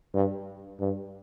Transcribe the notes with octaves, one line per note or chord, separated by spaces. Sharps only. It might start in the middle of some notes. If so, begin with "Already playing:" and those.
G2
G2